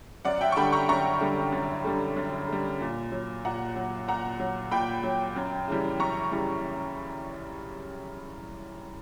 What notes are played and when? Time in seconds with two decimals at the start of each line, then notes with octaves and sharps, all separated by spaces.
0.25 F#2 D5 F#5
0.41 E5 G5
0.52 C#6
0.57 D3 G3 G5 B5
0.72 A#5 C#6
0.89 F#2 A#5 C#6
1.21 D3 G3
1.52 F#2
1.84 D3 G3
2.16 F#2
2.48 D3 G3
2.81 A#2
3.12 F#3
3.45 A#2 F#5 A#5
3.76 F#3
4.08 A#2 F#5 A#5
4.40 F#3
4.71 A#2 G5 B5
5.03 F#3
5.36 F#2
5.68 C#3 E3 G3
6.00 F#2 A#5 C#6
6.32 C#3 E3 G3